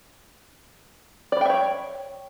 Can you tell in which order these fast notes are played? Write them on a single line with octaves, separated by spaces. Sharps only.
D5 B5 G5 E5 C#5